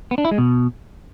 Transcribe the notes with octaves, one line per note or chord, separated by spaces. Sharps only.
B3
D4
E4
G#3
B2